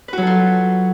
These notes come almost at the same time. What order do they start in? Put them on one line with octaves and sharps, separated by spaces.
B4 F#4 F#3 A4 F4